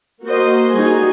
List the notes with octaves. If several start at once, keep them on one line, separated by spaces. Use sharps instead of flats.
A#3 F#4 A#4 C5 D#5
G3 D#4 F#4 G#4 G#5